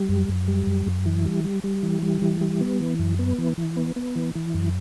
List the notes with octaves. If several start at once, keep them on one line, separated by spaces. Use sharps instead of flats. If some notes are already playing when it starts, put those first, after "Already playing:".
Already playing: G3
F#2
F#2
G3
F#2
F#2
E3
G3
G3
G3
E3
G3
E3
G3
B3
E3
F#2
B3
E3
E3
B3
B3
E3
E3
F#2